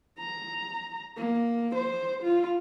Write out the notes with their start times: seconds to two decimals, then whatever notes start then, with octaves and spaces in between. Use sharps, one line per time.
0.19 A#5
1.17 A#3
1.75 C5
2.23 F4